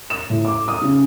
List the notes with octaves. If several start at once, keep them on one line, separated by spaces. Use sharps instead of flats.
E7
A2
D6
D#6
C#3